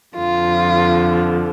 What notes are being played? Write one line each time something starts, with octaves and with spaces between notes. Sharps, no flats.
F2 D3 F3 F4